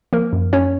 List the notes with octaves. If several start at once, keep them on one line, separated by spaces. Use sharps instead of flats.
F3 A#3 A#4
F#2
F#2 C#4 C#5